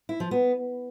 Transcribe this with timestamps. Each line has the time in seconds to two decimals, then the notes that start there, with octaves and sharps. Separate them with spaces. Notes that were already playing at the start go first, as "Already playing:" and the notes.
0.09 E4
0.20 F3
0.31 B3